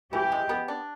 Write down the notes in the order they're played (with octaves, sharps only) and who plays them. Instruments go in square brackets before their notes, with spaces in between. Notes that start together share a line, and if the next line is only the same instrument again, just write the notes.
[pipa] E3 [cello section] G4
[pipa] G#3
B3
D4